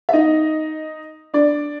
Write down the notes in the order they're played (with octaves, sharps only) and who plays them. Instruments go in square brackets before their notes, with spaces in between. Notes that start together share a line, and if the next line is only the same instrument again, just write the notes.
[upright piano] E5
D#4 D#5
D4 D5